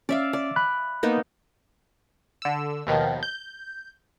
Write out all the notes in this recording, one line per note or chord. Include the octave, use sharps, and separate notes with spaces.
C#4 D5 E5 F5
D5
B5 F#6
A#3 B3 D#4
D3 E6
D#2 B2 D#3 F3
G6